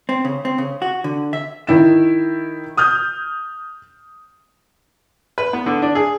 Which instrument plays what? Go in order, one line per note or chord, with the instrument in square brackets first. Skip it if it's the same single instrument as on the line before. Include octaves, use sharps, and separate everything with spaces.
[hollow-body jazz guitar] C4
C#3
C4
C#3
F#4
D3
E5
[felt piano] D#3 E4 E7
D#6 F6 G6
[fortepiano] B4
B3
D3
D4
G#4